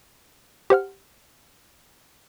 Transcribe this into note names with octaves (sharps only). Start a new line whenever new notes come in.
G4 C5 F#5 F6